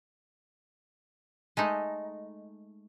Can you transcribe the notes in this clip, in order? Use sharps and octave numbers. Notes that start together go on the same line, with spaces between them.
G#3 A3 D#4